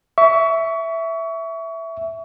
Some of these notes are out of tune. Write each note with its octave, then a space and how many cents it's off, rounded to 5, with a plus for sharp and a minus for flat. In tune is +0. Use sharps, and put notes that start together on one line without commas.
E5 +0 C#6 +30